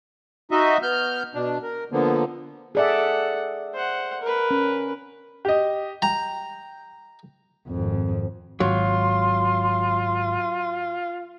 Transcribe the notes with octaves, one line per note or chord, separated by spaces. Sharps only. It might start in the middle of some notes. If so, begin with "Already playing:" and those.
D#4 F#4 D#5 E5
B3 F6 G6
B2 D4
A#4
D3 F3 A#3 B3
G#4 A4 D5 E5 F#5
C5 F#5
A#4 B4
C#4
G4 D#5
G5 A#5
G#1 F2
D#1 G#1 F#3 F4 C6